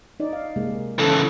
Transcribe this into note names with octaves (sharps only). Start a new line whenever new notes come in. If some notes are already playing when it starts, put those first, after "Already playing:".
D#4 D5
F5
C3 G#3 A#3
C#3 E3 A4